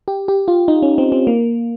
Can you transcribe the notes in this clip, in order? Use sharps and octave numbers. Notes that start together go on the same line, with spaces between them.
G4
G4
F4
D#4
C#4
C4
C4
A#3